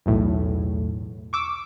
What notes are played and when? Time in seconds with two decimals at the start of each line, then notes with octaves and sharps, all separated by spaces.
0.06 B1 E2 A2
1.33 C#6 D6 E6